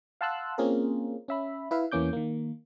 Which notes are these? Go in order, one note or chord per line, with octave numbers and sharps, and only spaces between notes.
F5 F#5 A5 C6 E6 F#6
A#3 C4 C#4 F4 G#4 A#4
C#4 E5 B5
E4 B4 E5 F5
E2 E3 A#3 C#4 D6 G6
D#3 A#3